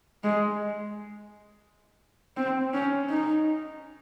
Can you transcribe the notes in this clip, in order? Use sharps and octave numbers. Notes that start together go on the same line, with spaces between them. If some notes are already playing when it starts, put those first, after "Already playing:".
G#3
C4
C#4
D#4